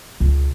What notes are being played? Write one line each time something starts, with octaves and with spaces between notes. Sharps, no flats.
C#2